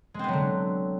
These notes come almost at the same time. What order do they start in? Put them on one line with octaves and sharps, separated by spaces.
G#3 C4 B3 F#3 D3